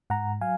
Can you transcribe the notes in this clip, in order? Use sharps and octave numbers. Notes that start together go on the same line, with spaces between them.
G#2 F#5 A#5
F#3 F5 G#5